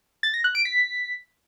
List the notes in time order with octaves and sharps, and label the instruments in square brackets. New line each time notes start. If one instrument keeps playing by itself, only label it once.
[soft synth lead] A6
A#6
F#6
D7
B6